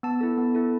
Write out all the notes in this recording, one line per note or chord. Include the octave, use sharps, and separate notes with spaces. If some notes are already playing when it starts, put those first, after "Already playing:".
B3 A5
E4 A4
B3
E4 A4